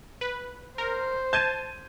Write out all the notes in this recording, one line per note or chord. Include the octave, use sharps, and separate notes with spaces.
B4
A#4 C5
A5 G6 G#6 D#7